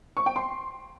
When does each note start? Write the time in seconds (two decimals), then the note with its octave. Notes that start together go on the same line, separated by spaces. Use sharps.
0.17 C#6
0.26 G5
0.36 C6